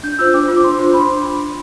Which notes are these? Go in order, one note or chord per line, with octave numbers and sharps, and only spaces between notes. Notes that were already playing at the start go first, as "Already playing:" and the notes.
D4 G6
F4 C5 E6
D4 D6
F4 C5
D6
D4 C6
F4 C5 C6
D4 B5